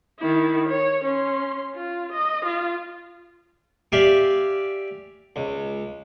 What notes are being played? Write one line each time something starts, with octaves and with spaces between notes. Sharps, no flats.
D#3 E4
C#5
C#4 C6
F4
D#5
F4
G4 D5 E5 F5 G5 G#5
C#2